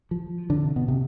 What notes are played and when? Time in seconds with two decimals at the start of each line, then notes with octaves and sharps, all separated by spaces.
0.11 F3
0.50 D3
0.64 C3
0.76 B2
0.88 C3